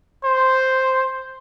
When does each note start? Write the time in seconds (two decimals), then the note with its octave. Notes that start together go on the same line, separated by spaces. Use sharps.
0.24 C5